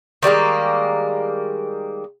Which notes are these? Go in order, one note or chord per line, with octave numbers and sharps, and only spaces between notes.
D#3 G3 G#3 A#3